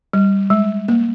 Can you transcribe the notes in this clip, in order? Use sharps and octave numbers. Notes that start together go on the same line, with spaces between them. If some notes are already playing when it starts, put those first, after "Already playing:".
G3
G#3
A#3